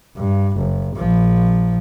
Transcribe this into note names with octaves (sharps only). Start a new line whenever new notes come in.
G2
F#1
A#1 F3